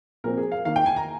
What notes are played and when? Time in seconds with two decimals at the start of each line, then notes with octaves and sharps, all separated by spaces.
0.24 A#2 F3 C4 A#4
0.38 G#4
0.52 F5
0.65 D#3 A#3 F5
0.76 G5
0.86 G#5
0.96 A#5